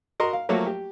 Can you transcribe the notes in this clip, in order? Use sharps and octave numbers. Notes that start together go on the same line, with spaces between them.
F#4 A#4 D#5 A#5 C6
F5
F3 F#3 A3 A#3 F#4 C#5
G4